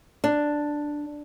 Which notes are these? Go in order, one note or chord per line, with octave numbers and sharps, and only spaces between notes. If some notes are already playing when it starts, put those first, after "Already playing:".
D4